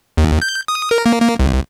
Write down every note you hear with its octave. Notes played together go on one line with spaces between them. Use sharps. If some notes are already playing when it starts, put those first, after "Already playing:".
D#2
G6
D#6
A#4
A#3
A#3
C2